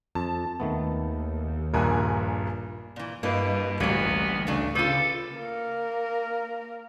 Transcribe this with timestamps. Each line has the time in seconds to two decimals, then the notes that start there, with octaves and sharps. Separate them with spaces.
0.15 F2 A5
0.60 D#2 D#3 A3 B3
1.74 A#1 G2 A#2 A#4 G#5 F#6
2.96 A#2 E3
3.23 G2 B2 A#3 E4 B4 D#5
3.80 A1 D2 F#3 G3 A#3 B3 G#6
4.47 C#3 A3 D4
4.75 C#3 F4 A4 B4 D6 G6 D#7
5.36 A#3 A#4